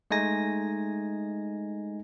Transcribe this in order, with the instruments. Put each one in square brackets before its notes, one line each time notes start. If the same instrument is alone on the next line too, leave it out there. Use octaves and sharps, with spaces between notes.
[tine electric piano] G#3 A3 D#4 G#5 A#6